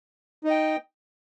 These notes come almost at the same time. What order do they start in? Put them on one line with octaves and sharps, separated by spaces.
D#4 D#5 G5